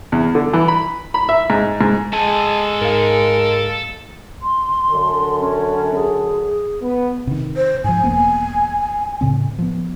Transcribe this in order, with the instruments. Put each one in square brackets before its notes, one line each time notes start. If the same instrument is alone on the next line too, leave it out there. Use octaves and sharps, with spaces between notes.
[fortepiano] E2
D3
E3
B5
B5
E5
G#2
G#2
[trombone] G#3 [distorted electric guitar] A4 G#5 [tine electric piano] A5
[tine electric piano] G#2 F5 [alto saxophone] A#4
[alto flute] C6
[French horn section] F#2 D3
[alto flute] C#4
G#4
[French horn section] B3
[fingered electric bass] C3 D#3
[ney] C5
[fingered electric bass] G#2 F3 [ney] G#5
[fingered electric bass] E1 A#3 B3
A2 C#3 C4
F3 B3